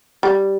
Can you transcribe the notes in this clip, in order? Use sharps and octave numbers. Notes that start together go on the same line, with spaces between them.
G3